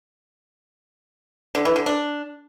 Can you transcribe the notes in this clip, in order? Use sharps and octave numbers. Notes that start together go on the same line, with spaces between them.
D3
E3
D3
D4